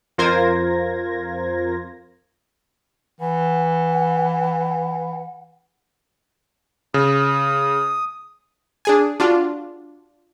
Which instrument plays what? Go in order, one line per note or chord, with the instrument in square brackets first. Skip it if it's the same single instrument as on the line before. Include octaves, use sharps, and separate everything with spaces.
[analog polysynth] F2 F4 A#4 C5 G#6 A#6
[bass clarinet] E3 [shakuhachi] F#5
[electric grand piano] C#3 [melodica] D#6
[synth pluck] D4 G#4 G#5
D4 F4 F#4